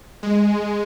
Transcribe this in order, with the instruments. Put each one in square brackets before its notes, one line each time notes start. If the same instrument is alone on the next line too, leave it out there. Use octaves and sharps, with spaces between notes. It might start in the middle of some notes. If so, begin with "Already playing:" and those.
[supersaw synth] G#3